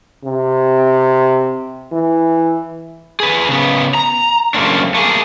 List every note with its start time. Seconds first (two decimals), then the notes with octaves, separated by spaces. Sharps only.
0.24 C3
1.92 E3
3.20 G#4 B4
3.49 C#3 B3
3.94 A#5
4.54 F#2 C#3 A3 A#3 C4 D4
4.94 A3 A#3 G#4